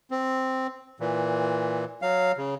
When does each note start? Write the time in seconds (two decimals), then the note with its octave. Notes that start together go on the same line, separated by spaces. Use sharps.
0.11 C4
1.00 A#2 E3
2.02 F#3 F5
2.37 C#3